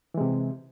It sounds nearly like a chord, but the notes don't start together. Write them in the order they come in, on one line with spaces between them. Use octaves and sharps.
E3 G#3 C3